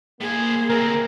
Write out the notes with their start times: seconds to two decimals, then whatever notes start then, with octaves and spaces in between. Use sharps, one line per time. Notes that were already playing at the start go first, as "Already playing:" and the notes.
0.21 A2 A#3 G#4 C5
0.70 D2 C4 A#4